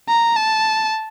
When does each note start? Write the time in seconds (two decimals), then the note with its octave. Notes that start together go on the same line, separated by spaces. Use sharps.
0.08 A#5
0.36 A5